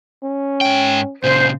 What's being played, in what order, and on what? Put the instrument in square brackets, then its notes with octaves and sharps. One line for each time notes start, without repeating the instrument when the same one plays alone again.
[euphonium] C#4
[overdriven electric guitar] G#2 G5
[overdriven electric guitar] A#2 C#3 [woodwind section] C5